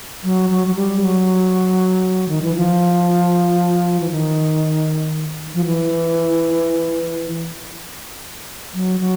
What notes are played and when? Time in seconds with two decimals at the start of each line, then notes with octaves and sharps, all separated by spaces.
0.24 F#3
0.50 F#3
0.67 F#3
0.75 G3
1.01 F#3
2.29 D#3
2.42 E3
2.56 F3
4.00 E3
4.10 D#3
5.54 F3
5.65 E3
8.74 F#3
9.00 F#3